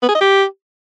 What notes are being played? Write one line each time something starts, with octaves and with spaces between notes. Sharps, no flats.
B3
G#4
D#5
G4